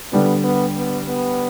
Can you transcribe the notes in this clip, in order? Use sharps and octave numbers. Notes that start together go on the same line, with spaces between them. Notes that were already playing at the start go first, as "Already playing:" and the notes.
D3 G3 B3 D4
B3
B3
B3